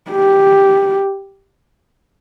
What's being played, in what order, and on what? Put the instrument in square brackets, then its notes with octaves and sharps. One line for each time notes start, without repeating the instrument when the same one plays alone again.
[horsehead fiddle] G4